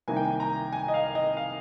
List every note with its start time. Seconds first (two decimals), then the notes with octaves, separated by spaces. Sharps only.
0.08 C2 C3 D#3 A#3 G#5
0.16 G5
0.25 G#5
0.40 A#5
0.72 G#5
0.88 D#5
0.94 F5
1.15 D#5
1.37 F5